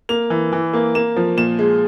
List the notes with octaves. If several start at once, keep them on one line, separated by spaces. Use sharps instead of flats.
A#3 F7
E3
E3
A#3
A#3 E7
F3
A#2 E7
G#3